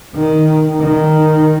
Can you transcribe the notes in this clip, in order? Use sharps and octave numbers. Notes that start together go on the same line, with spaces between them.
D#3
D#3